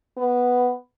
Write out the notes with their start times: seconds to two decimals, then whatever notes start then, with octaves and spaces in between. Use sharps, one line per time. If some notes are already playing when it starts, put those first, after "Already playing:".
0.17 B3